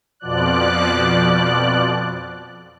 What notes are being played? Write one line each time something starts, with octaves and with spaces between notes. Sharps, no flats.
F2 B2 F3 D5 F#6